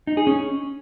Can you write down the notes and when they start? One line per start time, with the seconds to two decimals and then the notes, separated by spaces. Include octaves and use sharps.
0.07 D#4
0.17 G#4
0.27 C#4